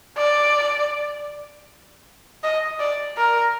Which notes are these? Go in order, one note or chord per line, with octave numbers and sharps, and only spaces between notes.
D5
D#5
D5
A#4